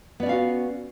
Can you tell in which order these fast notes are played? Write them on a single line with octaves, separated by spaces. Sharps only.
B3 D5 C#4 F5 F#4